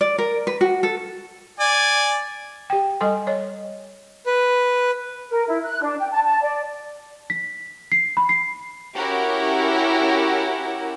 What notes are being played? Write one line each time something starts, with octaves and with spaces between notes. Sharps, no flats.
D5
A#4
B4
F#4
A4
D5 G#5
G4 G5
G3 A4 D#5 G#5 C6
C#5 D#5
B4
A#4
E4
F#6
D4
G5
A5
A5
D5
B6
C7
B5
C7
C#4 E4 F#4 G4 A#4